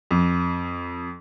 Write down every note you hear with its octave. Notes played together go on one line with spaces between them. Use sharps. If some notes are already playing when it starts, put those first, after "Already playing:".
F2